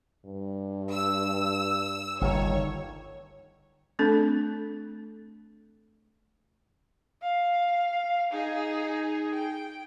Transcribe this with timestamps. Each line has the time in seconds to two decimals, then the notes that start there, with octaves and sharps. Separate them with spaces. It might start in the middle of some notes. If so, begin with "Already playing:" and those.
0.25 G2
0.93 E6
2.21 G1 G2 D#3 C#5
3.99 A3 C4 D4 A4
7.22 F5
8.32 D#4 G#4
9.35 G5